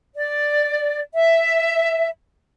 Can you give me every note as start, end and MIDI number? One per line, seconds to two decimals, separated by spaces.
0.15 1.00 74
1.15 2.09 76